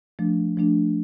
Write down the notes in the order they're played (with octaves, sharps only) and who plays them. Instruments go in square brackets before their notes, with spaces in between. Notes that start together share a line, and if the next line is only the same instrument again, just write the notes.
[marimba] F3 A3 D4
F3 A3 D4